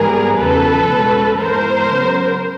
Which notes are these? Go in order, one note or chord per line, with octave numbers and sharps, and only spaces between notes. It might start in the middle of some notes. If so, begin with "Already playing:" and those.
Already playing: G#2 E3 G3 B3 G#4 A#4
E2 C#3 F3 A4 B4
B2 G#3 C#4
G#2 E3 G#3 B3 A#4 C5
C#3 F#3 B3